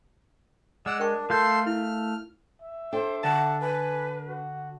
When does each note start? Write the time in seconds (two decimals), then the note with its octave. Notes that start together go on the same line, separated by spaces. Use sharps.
0.86 G#3 D5 F#5 E6
1.00 D4 A#4 G5 C#6
1.30 A3 F4 A4 F5 C6 G6
1.66 E4 F6
2.62 E5
2.93 D4 A4 C5 G5
3.23 D3 F#5 A5
3.61 B4 G#5
4.28 F#4